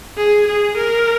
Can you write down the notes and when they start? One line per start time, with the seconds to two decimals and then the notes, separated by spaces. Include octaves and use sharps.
0.17 G#4
0.48 G#4
0.77 A#4